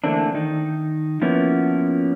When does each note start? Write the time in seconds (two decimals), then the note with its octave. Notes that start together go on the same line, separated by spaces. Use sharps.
0.04 D3 E3 A3 A#3 C4 D4
0.35 D#3 D#4
1.21 F3 A#3 B3 C#4 E4